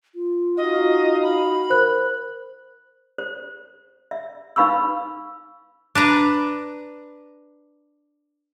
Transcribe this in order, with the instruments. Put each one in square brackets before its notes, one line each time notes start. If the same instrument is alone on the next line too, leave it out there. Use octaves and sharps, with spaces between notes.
[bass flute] F4
[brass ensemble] D#4 F#4 F5 [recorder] D#5
[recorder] B5
[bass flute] A#4 [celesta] C5 F#6
[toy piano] C5
E5
D#4 B4 F5 B5 C#6 E6
[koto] D4 B4 A#5